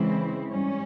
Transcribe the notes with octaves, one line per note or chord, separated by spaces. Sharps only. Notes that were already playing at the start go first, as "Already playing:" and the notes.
Already playing: C#3 E3 G#3 C4 E4
G#2 G3 C#4